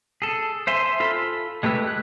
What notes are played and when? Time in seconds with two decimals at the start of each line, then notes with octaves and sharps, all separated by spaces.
0.22 G#4 A4
0.67 C5 E5 G#5 C6
1.00 F4 A4 B5
1.63 G#3 A3 G4 B4 E6
1.87 F#6